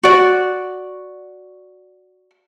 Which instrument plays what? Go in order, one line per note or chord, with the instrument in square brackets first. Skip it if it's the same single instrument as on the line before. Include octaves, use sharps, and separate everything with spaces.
[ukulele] F#4 D5